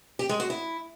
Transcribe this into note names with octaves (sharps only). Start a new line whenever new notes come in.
G4
G#3
F#4
E4